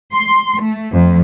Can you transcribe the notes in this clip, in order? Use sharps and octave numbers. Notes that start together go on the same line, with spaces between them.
C6
A3
F2